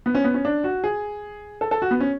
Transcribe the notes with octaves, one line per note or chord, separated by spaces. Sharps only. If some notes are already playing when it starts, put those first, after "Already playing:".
B3
C#4
B3
C#4
D4
F#4
G#4
A4
A4
F#4
B3
C#4